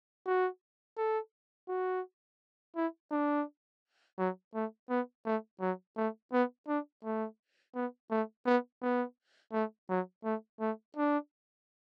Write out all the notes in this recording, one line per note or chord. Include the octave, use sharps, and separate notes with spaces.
F#4
A4
F#4
E4
D4
F#3
A3
B3
A3
F#3
A3
B3
D4
A3
B3
A3
B3
B3
A3
F#3
A3
A3
D4